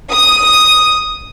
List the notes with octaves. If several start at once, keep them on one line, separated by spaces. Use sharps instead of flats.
D#6